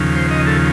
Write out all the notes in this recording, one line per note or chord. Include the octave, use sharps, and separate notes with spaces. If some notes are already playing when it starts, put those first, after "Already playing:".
Already playing: D#2 C#3 F3
C5
D#5
A4